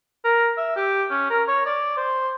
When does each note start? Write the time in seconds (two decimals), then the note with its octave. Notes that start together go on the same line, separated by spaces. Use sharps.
0.24 A#4
0.57 E5
0.76 G4
1.10 C#4
1.30 A#4
1.48 C#5
1.66 D5
1.97 C5